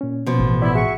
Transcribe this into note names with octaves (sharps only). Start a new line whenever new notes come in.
A#2 C#4
B2 F3
A1
B3 E4 D5
F#4 G#4 E5 C#6